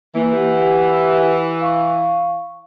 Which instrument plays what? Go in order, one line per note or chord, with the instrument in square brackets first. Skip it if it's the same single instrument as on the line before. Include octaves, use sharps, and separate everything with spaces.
[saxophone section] E3 [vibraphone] A#3
[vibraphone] G4 F#5
F5 C#6